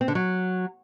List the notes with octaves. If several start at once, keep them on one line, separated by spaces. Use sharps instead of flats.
C4
D3
F#3